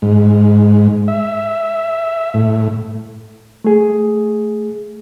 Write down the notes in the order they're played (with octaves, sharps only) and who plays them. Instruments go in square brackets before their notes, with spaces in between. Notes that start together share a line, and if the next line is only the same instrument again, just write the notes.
[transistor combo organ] G#2
E5
A2
[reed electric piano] A3 G#4